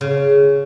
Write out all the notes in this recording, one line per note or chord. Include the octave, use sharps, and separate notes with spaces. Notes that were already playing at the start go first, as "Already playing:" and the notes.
C#3